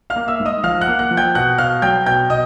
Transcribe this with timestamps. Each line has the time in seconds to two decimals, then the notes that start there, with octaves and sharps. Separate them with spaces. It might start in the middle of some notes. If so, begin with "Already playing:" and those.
0.10 F5 F6
0.16 A#3
0.28 E5 E6
0.40 G#2
0.45 D#5 D#6
0.64 F3 F5 F6
0.81 F#5 F#6
0.88 A#3
0.99 F#5 F#6
1.11 F3
1.17 G5 G6
1.35 B2 F#5 F#6
1.58 B2 F5 F6
1.82 F#3 G5 G6
2.06 B2 G5 G6
2.30 B2 D#5 D#6